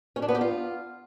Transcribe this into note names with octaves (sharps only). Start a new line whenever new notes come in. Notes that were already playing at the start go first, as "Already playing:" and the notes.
C#4
D4
B3
G4
F4